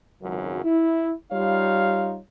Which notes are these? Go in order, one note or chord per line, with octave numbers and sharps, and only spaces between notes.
G#1 C#2 F#2 F#3
E4
G3 D#4 F4 C#5 F5